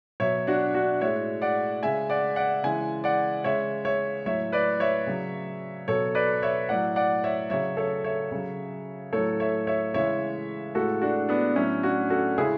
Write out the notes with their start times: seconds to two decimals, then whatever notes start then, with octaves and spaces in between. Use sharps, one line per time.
0.20 B2 F#3 C#5 E5
0.47 D4 F#4
0.74 D4 F#4
1.01 A2 G#3 C#5 E5
1.42 D5 F#5
1.83 C#3 G#3 E5 G#5
2.10 D5 F#5
2.36 D5 F#5
2.64 C#3 E3 G#3 E5 G#5
3.04 D5 F#5
3.44 C#3 G#3 C#5 E5
3.85 C#5 E5
4.25 A2 F#3 C#5 E5
4.52 B4 D5
4.80 C#5 E5
5.07 C#3 F#3
5.88 B2 F#3 A4 C#5
6.15 B4 D5
6.43 C#5 E5
6.69 A2 F#3 D5 F#5
6.96 D5 F#5
7.24 C#5 E5
7.50 C#3 F#3 C#5 E5
7.77 A4 C#5
8.04 C#5 E5
8.31 C#3 F#3
9.13 A2 F#3 A4 C#5
9.40 C#5 E5
9.67 C#5 E5
9.94 C#3 E3 G#3 C#5 E5
10.75 A2 G#3 F#4 A4
11.02 D4 F#4
11.29 B3 D4
11.55 A2 F#3 C#4 E4
11.83 D4 F#4
12.10 F#4 A4
12.37 C#3 G#3 E4 G#4